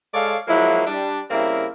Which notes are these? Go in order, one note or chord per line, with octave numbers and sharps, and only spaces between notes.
G#3 A4 C#5 D5 F5
F3 F#3 G#3 A#3 E4
G3 D4
C#3 G3 A#3 C4 E4 A#4